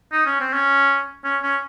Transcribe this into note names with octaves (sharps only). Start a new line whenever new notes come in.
D#4
C#4
C4
C#4
C#4
C#4